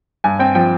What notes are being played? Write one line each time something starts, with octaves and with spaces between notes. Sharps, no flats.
G2 G#5
C4 G5
F3 G5